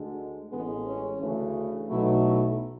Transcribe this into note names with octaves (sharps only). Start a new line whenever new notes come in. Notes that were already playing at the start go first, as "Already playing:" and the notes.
Already playing: D2 D3 G#3
A1 A2 G#3 B3
C#4
D2 C#3 E3 A3
B1 B2 F#3 A3 E4
E4